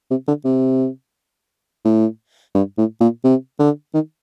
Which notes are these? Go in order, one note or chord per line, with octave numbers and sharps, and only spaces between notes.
C3
D3
C3
A2
G2
A2
A#2
C3
D3
D#3